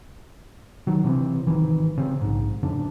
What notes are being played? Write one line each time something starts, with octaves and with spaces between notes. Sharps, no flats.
D#3 F#3
C3 E3 B3 C4
G#1 D2 D#3 E3
C#3 C4
A#1 G#2
F2 C#3 D4